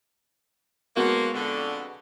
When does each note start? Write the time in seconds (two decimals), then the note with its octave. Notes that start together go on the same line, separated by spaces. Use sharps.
0.97 F3 F#3 G#3 A#3 B3 F#4
1.33 F2 D3